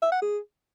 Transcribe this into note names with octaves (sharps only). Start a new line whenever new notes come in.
E5
F#5
G#4